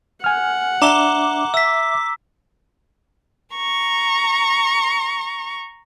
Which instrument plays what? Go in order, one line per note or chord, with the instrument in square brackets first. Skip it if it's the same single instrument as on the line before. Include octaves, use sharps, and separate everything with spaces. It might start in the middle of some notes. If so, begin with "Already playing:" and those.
[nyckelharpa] F#5 [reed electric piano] G#5 F6
[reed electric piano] D4 E5 [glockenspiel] A#5 E7 G7 [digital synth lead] D6
[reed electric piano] E5 [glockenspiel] E6 B6
[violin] A#5 C#6